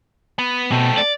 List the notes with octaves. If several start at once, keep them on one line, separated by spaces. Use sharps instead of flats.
B3
B2 A3 C4
D5